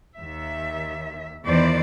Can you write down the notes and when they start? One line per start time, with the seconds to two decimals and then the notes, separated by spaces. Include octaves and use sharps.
0.18 D#2 E5
1.45 E2 B2 D#3 E3 C5 D5